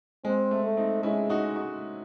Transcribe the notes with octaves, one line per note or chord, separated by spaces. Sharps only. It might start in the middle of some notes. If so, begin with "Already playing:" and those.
G#3 C4
A3
A3
C4 D#4
G#3 C#4 E4
D#4 F#4
D#4 F#4